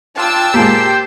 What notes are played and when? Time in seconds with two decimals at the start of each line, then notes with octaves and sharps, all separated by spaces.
0.18 D4 F4 G5 A5 E6
0.54 A#2 G#3 G4 C5